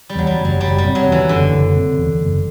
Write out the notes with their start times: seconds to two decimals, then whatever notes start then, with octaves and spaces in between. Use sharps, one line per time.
0.09 G3
0.15 E2 F#3
0.27 G3
0.39 F#1
0.45 F#3
0.61 F#1 G3
0.78 G3
0.84 C3
0.95 F#3
1.07 E2
1.12 E3
1.29 F#1 D3
1.52 F#1
1.74 C3
1.98 E2
2.20 F#1